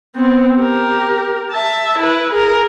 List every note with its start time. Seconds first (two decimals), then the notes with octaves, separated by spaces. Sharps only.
0.16 B3 C4
0.57 G4 A#4
1.52 E5 A5
1.98 E4 B4
2.32 G#4 A#4